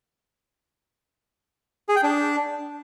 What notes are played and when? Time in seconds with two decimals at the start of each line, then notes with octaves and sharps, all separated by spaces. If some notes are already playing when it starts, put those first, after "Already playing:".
1.89 G#4
1.96 G5
2.03 D4